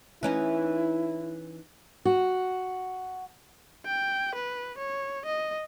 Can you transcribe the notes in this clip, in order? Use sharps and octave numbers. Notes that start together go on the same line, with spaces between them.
E3 C#4 D#4 E4
F#4
G5
B4
C#5
D#5